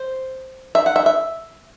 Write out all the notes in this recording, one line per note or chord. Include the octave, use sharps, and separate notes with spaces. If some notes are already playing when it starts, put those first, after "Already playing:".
Already playing: C5
E5
F#5
E5
E5